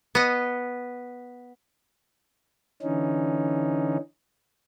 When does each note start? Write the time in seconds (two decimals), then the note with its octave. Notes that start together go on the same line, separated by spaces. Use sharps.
0.15 B3 D#5
2.82 D3 E3 C#4 D#4